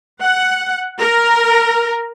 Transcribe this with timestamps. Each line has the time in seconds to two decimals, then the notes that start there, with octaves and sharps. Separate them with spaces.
0.23 F#5
1.00 A#4